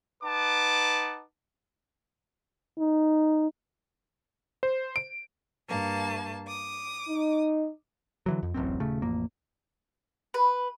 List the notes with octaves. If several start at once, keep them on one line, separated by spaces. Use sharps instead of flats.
D#4 B4 F#5 A5 D6
D#4
C5
D7
G2 A#3 A5
D6 D#6
D#4
D3 E3 F#3
F2
D1 A1 F#2 C4
D#1 C#3 A3
A1 F2 A#3
B4